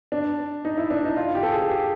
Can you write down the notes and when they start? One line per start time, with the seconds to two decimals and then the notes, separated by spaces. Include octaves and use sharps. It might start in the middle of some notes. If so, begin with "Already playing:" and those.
0.12 D4
0.65 D#4
0.78 E4
0.90 D4
1.04 D#4
1.17 F4
1.35 G4
1.43 A4
1.52 G#4
1.69 G4